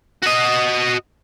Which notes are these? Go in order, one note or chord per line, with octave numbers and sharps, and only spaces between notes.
F#4 D#5